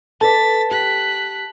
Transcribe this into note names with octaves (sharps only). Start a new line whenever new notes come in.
A4 B4 D5 A5 A6 B6
G4 F#6 B6